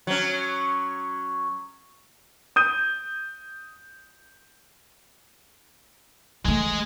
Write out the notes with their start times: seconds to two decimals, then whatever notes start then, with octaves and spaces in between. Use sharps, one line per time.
0.07 F#3 C#4
2.56 D#6 G6 D#7
6.45 E3 G#3 A3 G#4